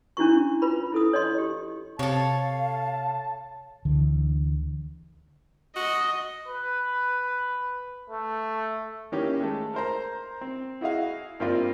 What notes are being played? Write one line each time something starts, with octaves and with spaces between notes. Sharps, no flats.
C#4 D4 E4 F#4 C#6
F4 B4 B5
E4 A4 D#6
C#5 D#5 C6
G4
C3 A4 C#5 F5 A5
D2 D3 E3
F#4 D#5
B4
A3
D#3 A#3 C#4 E4 G4
G#3 A3 A4
A#4 C5 A#5
C4
E4 F#4 G#4 D#5 F5
G2 A#3 C4 F4 D5